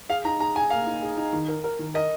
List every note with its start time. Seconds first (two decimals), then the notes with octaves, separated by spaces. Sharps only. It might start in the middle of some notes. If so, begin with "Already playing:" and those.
0.09 G#4 F5
0.24 D#4 A#5
0.40 G#4 A#5
0.55 G#4 G#5
0.70 A#3 F5
0.86 D#4
1.02 G#4
1.17 D#4
1.33 D#3
1.48 A#4
1.64 A#4
1.79 D#3
1.94 A#4 D#5